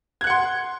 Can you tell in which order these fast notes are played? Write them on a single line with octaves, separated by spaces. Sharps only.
G#6 F#6 F#5 C6